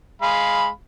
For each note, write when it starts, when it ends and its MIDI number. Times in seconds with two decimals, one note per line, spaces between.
0.22 0.68 56
0.22 0.68 77
0.22 0.68 83